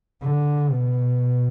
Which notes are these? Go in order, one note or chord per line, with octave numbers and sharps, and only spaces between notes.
D3
B2